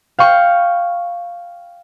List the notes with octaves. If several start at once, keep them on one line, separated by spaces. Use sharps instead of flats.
F5 G5 C#6